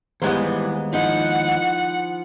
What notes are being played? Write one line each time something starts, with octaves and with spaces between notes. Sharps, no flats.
D#2 E3 G3 G#3 B3 C5
F3 D#4 E4 F#5